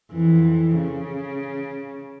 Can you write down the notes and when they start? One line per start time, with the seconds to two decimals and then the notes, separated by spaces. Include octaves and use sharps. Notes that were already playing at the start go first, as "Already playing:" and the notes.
0.12 F2 E3
0.77 C#3